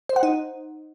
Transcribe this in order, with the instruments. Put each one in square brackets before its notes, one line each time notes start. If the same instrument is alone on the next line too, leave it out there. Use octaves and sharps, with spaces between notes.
[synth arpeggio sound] C5
F#5
D#4